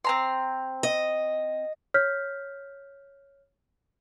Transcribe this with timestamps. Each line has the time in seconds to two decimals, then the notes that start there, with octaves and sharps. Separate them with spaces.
0.04 C4 A#5 C6
0.83 D#5
1.94 C#5 F6 G6 B6